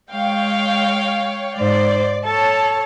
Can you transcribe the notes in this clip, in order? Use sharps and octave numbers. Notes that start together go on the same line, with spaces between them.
G#3 C#5 F5 G5
G#2 C5 D5
A4 C#5 A5